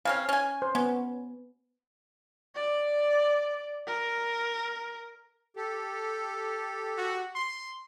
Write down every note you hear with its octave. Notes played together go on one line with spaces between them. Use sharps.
C#3 C4 C#4 F5
C#4 G#5
C5
B3 C#4
D5
A#4
G4 A4
F#4
C6